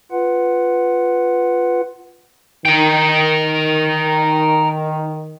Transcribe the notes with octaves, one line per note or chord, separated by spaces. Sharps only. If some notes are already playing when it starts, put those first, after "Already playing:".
F4 B4 F#5
D#3 A#4 G5